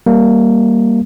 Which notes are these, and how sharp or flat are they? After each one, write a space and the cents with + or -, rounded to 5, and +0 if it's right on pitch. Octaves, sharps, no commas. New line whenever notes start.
G3 +0 A#3 +0